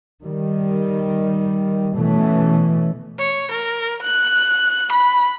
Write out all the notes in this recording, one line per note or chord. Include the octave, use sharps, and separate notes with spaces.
D#3 G3
B2 E3 A3 C#4
C#5
A#4
F#6
B5